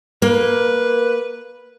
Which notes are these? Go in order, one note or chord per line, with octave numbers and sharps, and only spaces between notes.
A#3 B4